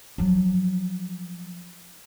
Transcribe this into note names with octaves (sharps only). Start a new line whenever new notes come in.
F3 F#3